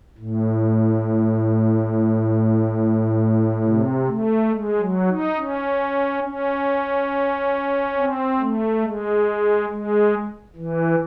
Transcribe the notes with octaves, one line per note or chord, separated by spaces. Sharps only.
A2
C3
A3
G#3
F#3
D#4
C#4
C#4
C4
A3
G#3
G#3
E3